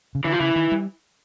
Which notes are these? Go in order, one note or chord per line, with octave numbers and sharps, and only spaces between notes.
C#3
D3 E3
F3
C#3 E3
D#3
G3